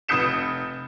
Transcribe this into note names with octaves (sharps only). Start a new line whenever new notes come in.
F1 B4 D#6 G6 C#7 E7